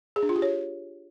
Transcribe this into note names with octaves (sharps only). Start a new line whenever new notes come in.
G#4
D4
F4
G4
C#5